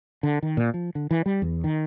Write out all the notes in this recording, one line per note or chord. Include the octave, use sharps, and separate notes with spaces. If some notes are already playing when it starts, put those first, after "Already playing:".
D3
D#3
A#2
F3
D3
E3
G3
E2
D#3